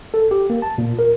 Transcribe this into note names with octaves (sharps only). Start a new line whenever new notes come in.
A4
G4
A#3
A5
A#2
A#4